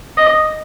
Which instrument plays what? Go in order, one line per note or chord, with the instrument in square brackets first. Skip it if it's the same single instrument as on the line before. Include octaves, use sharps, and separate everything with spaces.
[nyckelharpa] D#5